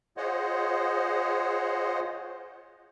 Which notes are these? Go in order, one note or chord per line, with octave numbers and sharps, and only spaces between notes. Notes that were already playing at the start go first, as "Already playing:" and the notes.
F4 G#4 C5 C#5 D#5 F#5